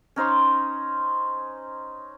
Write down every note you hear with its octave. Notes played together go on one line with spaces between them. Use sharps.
C#4 D#4 C5 C6